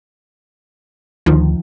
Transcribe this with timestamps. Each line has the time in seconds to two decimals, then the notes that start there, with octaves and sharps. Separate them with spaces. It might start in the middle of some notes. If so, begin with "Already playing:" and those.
1.26 D2 D#3 F3